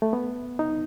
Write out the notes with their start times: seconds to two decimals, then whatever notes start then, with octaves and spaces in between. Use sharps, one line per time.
0.02 A3
0.13 B3
0.59 D#4